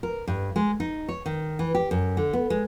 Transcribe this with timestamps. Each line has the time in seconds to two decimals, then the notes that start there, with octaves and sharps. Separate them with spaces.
0.03 A#4
0.28 G2
0.56 G#3
0.80 D#4
1.08 C#5
1.26 D#3
1.59 E3
1.74 G4
1.91 F#2
2.17 D3
2.33 B3
2.50 G#3